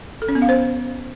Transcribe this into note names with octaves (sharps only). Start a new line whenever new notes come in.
A4
C#4
B3
F5
C5